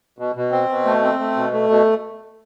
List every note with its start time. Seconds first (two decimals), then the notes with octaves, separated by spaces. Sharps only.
0.19 B2
0.36 B2
0.51 C4
0.69 B2
0.85 A3
1.03 C4
1.19 A3
1.36 B2
1.53 A3
1.70 B2